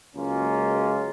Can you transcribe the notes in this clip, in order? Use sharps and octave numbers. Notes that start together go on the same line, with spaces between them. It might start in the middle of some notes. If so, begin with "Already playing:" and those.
C#2 F#3 G#3 A#3 C#4 F4